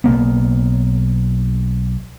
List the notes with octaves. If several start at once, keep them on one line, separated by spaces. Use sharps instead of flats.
B1 A#3 B3